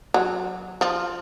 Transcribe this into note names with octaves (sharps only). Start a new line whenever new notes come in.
F#3
F3